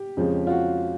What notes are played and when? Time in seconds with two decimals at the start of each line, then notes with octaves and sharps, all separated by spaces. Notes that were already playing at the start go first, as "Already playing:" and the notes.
Already playing: G4
0.17 F2 C#3 F3 G#3 C#4
0.47 F4
0.50 F#4